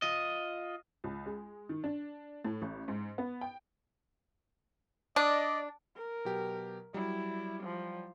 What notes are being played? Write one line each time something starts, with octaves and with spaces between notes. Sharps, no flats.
F4 D#5
C#2
G#3
D#3
D4
A2
A1
G#2
B3
G5
D4 D5 D#5
A#4
B2 F#3 G4
F#3 G3 E4
F3